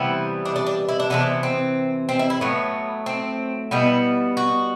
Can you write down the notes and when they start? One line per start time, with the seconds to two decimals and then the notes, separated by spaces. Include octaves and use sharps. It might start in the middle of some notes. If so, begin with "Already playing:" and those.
Already playing: C3 E3 G3 B3 E4
0.45 D4
0.56 D4
0.67 D4
0.89 E4
1.00 D4
1.10 C3 E3 B3 D4
1.43 C4
2.09 C4
2.19 E4
2.30 E4
2.41 A2 F#3 A3 B3
3.06 C4
3.71 B2 G3 B3 E4
4.37 F#4